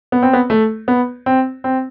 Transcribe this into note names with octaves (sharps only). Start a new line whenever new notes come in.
B3
C4
B3
A3
B3
C4
C4